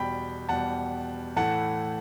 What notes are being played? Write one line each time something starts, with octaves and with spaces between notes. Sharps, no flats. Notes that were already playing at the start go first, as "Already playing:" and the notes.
Already playing: E2 B2 G3 G5 B5
E2 B2 G3 F#5 A5
A2 E3 A3 F#5 A5